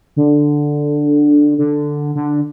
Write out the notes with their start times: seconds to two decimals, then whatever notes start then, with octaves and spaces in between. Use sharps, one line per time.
0.16 D3
1.58 D3
2.15 D3